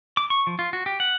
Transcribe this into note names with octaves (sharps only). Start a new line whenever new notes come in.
D6
C#6
F3
F4
F#4
G4
F#5